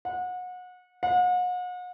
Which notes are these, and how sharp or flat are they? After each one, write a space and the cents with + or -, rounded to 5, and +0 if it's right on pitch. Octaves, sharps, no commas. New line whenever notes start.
F#5 -30
F#5 -40